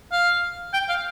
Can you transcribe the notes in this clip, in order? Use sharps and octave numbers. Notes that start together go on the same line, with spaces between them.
F5
G5
F5